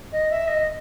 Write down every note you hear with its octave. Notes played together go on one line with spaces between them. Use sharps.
D#5
E5
D#5